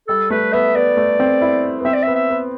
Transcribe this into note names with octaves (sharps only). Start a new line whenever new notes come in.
G3 A4
A3 B4
B3 E5
B3 D5
A3
C4
E4
B3
C4 E5
D5
E5
B3
E5
B3